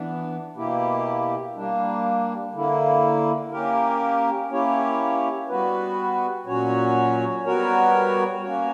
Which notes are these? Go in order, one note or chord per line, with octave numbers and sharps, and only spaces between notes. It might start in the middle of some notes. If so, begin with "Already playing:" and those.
Already playing: E3 B3 D4
B2 A#3 E4 G4
G3 A#3 D4
D3 A#3 E4
A#3 C#4 G4 A#4
A#3 C#4 E4 G4 C#5
G3 B3 F#4 B4
A#2 F#3 C#4 F#4 C#5
G3 B3 F#4 A#4 C#5
A#3 C#4 F#4 C#5